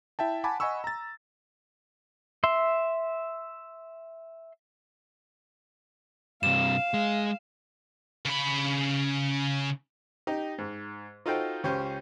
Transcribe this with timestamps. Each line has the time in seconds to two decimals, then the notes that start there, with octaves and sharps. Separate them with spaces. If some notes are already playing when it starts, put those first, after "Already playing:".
0.19 E4 E5 G5 A5
0.44 F#5 G#5 A5 B5 D6
0.60 D#5 F#5 G#5 B5 C#6 E6
0.84 A#5 A6
2.44 E5 C6
6.43 G2 C3 F5 E7
6.94 G#3
8.25 C#3 B5
10.27 D#4 G4
10.58 G#2
11.26 D#4 F4 F#4 A4 C5 G5
11.63 C#2 C#4 G4 C5